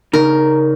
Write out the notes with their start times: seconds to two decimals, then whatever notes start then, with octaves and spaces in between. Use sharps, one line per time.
0.13 C#3 D#4 A#4